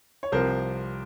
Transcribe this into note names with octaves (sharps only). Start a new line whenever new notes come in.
C#5
C2 C3 F3 A#4 C5